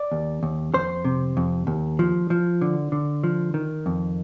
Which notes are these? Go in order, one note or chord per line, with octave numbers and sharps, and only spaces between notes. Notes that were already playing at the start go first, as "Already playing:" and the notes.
Already playing: D5
D#2
D#2
F2 C5
C3
F2
D#2
F3
F3
D3
D3
F3
D#3
F2